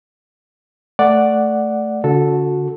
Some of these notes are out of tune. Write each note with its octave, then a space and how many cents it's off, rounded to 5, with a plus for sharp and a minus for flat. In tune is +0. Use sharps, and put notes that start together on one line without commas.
A3 +0 D5 +0 F#5 +0
D3 -45 F#4 -20 A4 -5